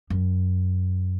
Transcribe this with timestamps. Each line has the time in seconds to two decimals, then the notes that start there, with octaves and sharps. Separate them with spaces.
0.10 F#2